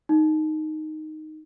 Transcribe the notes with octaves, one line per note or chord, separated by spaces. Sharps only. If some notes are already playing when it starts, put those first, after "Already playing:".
D#4